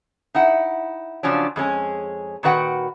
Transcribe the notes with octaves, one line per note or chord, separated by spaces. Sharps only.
D#4 E4 F#5
C#3 F3 F#3 C#4 D4
F2 G#3 C#4 G#4
A#2 D#3 F#4 B4 F#5 G5